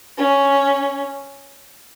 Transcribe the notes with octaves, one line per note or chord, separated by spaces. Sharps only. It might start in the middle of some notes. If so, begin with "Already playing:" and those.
C#4